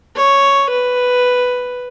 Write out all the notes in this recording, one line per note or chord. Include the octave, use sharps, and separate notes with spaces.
C#5
B4